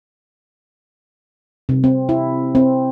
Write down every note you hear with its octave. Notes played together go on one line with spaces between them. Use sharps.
C3
C4
E4
C4